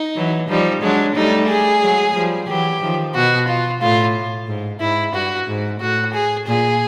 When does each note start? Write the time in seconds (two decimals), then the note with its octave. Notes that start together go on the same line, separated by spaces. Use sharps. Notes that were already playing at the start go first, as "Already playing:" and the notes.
Already playing: D#4
0.16 E3 F#3
0.49 F3 G3 D#4
0.82 F#3 G#3 D4
1.15 G3 A3 D#4
1.48 G#4
1.81 F#3 G#3
2.14 F3 G3
2.48 E3 F#3 G4
2.81 D#3 F3
3.15 B2 F#4
3.48 F4
3.81 A2 F4
4.48 G#2
4.81 G#2 E4
5.14 G2 F#4
5.47 G#2
5.81 A2 F#4
6.14 G#4
6.47 A#2 G#4